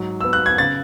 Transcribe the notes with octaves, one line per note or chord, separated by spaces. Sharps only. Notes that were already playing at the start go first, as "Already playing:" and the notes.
Already playing: G#2 F#3
B3 E6
F#6
G#6
C#3 A6